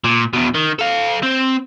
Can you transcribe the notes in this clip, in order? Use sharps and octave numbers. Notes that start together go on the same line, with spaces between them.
A#2
E2 B2
D#3
A4 F5
C4